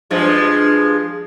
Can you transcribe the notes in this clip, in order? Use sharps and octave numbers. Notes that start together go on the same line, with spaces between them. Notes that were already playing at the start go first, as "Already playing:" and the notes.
G2 F3 G#3